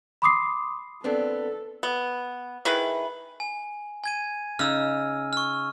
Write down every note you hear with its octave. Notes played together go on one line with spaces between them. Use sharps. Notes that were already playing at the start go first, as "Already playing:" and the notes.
B5 C6 D6 D#6 C7
B3 C4 D4 A4
B3
D#3 E4 G#4 B4
G#5
G#5 G#6 D#7
C#3 D#4 E6 F6
C#6 F6